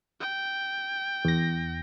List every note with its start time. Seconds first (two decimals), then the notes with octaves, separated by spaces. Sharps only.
0.20 G5
1.25 E2 A#6